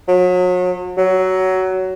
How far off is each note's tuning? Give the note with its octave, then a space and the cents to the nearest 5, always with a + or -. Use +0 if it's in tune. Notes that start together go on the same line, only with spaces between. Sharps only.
F#3 -35
F#3 +15